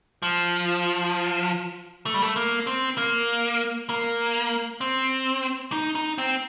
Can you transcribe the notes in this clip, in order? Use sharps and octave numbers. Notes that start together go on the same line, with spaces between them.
F3
A3
G3
A3
A#3
C4
A#3
A#3
C4
D#4
D#4
C4